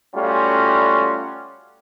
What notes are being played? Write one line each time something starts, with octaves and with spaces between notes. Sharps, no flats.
G3 A3 C#4 F4 F#4